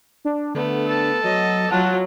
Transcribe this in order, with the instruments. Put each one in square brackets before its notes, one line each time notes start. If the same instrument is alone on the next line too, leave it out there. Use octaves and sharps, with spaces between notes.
[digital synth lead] D4
[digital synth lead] D3 [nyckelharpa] A3 B3
[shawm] A4
[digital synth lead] F#3 [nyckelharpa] D#5
[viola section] F#3 [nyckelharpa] F4 [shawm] F#5 [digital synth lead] A5